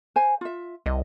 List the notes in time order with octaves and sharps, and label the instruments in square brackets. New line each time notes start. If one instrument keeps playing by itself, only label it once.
[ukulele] C5 G#5
F4 E5
[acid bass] C2 [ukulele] D#5